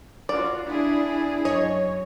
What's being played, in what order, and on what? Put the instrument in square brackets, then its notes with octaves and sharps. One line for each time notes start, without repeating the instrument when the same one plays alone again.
[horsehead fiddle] F4 F#4 [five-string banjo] D5
[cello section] D4 [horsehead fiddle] E4 G#4
[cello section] F#2 [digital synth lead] C#5 [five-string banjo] D#5